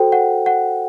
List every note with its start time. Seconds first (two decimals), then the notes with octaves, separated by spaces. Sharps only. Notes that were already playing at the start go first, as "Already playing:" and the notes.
Already playing: F#4 A4 C5 G5
0.12 F#5
0.46 F#5